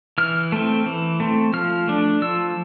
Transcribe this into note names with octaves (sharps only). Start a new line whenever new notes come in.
E3 F6
A3 C4
E3
A3 C4
F3 F6
A3 D4
F3 E6